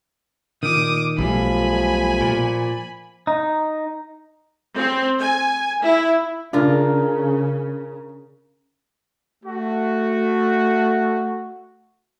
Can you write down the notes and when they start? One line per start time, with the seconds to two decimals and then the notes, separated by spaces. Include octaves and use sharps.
0.63 A#2 D#3 D6 D#6
1.18 B1 B2 F3 G3 A3 G#5 B5
2.21 A#2
3.27 D#4
4.77 C4
5.18 G#5
5.82 E4
6.53 C#3 D4 F4 A#4
9.43 A3 F#4